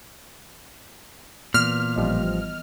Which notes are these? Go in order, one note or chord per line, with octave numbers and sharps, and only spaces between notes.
A#2 E3 B3 F6
A1 F3 G3 D#5